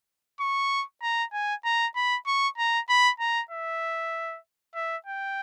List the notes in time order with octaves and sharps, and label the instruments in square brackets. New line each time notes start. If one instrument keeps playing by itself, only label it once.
[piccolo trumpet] C#6
A#5
G#5
A#5
B5
C#6
A#5
B5
A#5
E5
E5
G5